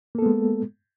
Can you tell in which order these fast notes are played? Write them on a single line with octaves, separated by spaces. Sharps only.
A#3 A4 B3 G#3